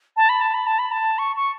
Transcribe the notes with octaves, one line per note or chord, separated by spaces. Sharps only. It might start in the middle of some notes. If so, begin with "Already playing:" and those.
A5
B5
A5
B5
A5
B5
A5
C#6
C#6